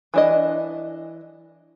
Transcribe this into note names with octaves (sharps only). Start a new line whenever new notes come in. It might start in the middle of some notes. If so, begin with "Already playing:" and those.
E3 D4 D#5